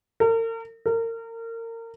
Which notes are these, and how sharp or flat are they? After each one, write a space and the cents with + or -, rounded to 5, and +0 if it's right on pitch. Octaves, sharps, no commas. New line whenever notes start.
A#4 -40
A#4 -30